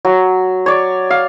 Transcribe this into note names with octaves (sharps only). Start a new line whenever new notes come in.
F#3
C#5 D5
F5